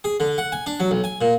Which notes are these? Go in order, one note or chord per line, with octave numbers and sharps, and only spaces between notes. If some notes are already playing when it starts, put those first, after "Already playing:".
G#4
D3
F#5
G#5
D4
F#3
B1
G#5
A#2